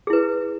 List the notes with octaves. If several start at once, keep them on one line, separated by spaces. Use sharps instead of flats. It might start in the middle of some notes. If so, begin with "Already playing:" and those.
E4 G#4 B4